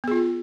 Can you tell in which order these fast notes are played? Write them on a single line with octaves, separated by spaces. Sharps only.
B3 G#4 F4